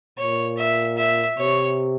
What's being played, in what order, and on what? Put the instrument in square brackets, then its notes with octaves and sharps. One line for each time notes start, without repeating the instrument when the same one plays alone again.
[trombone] A#2 [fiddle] C#5
[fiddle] E5
E5
[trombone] C3 [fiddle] C#5